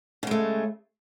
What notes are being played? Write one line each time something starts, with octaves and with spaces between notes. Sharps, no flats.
C#3 G#3 A3